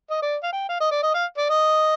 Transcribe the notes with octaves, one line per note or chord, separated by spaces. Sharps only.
D#5
D5
F5
G5
F5
D#5
D5
D#5
F5
D5
D#5